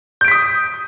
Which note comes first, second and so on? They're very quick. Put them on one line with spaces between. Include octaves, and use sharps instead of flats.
G6 D7 B6 D#6